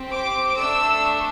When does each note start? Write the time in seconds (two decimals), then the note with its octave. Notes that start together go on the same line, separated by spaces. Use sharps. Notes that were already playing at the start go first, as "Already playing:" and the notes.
Already playing: C4 G4
0.12 D6
0.57 A3 D4 A4 E6